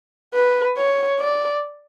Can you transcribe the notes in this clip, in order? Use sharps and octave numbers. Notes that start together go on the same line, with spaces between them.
B4
C#5
D5